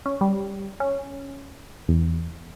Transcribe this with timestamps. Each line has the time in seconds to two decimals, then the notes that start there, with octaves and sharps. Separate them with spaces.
0.06 C#4
0.21 G3
0.80 C#4
1.88 E2